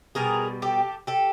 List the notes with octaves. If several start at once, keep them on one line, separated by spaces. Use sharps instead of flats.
B2 G3 G#4 A#4
G4 A4
G4 A4